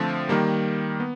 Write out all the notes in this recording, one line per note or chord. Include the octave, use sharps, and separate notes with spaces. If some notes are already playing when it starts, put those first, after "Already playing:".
Already playing: D3 F3 A3 C4
D#3 G3 A#3
B3